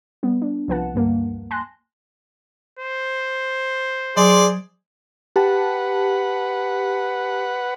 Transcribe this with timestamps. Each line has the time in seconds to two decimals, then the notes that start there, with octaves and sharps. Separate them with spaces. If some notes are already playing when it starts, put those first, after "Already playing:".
0.23 G3 B3
0.42 D4
0.68 C2 F3 B4 F#5 A5
0.94 D2 G2 G3 A#3
1.51 G#5 A5 C6 F#6 A#6
2.79 C5
4.17 F#3 G#4 D5 C6
5.36 G4 B4 F#5 A5